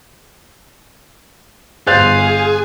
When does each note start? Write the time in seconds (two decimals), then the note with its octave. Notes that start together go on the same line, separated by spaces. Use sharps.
1.87 G1 G#4 C5 F5 F#6 A6